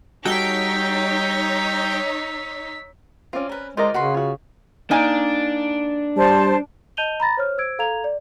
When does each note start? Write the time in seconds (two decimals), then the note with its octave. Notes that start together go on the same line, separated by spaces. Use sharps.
0.25 G3 D#4 F#4 A4 C#5 G5 E6 B6
3.33 C4 C#4 F4 D5
3.49 A#4 B4
3.77 G#3 F4 A#4 C5 D5 D#5 A#5
3.94 C#3 F#4 B4 C6
4.14 F4 F#4 C#5
4.91 A#3 D4 D#4 G#5
6.17 G3 C5 A5
6.97 D#5 A5 G6 D#7 F7 G7
7.20 A#5 B5 A6 A#6
7.37 C5 C#5 F6
7.58 C5 E6 G#6 D7
7.79 A4 F5 A#5 G#6 F7
8.04 D5